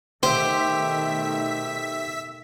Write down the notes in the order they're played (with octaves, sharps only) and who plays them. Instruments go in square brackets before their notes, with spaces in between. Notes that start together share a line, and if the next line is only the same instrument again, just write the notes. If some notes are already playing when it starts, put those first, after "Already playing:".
[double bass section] B2 D#3 A3 [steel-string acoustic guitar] G4 [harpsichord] C5 [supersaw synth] E5 B6